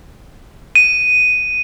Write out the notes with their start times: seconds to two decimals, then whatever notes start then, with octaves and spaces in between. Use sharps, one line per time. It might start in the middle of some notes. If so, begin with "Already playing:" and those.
0.75 D#7